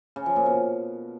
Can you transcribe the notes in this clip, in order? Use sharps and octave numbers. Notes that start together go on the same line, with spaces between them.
C#3
F3
A#2
B2